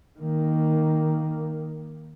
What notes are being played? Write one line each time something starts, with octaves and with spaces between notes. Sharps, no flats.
D#3 A#3